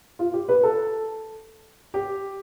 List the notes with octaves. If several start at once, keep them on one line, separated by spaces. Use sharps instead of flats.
F4
G4
B4
A4
G4